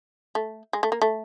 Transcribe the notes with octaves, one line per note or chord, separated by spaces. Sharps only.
A3
G#3
A3
A#3
A3